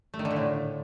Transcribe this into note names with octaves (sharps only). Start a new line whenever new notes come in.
A3
D#3
D3
A#2
A2